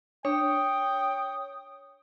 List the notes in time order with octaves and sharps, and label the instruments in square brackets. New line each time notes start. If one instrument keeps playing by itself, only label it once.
[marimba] D4 [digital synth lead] C#5 [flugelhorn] G5 [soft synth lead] D#6